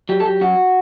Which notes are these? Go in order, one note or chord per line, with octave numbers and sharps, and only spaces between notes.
F#3 G4
A4
F#3 G4
F#2 F#4